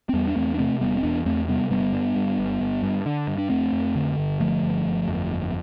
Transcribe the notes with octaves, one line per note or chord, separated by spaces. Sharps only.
C4
E2 G3 B3
D4
E2 A3 C4
D4
C3 A3 C4
E1 G3 B3
C4
E2 B3 D4
E2 A3 C4
C3 G3 B3
G1 G3 B3
G2
G2
G1
G1
G2
D3
G2
D4
F2 A3 C4
F2
D3
G1
D3 F3 A3
G1
G1
F2
G1